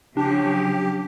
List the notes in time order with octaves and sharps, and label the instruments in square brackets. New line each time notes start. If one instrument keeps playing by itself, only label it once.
[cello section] C#3 F3 F#3 [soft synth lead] D4 [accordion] G4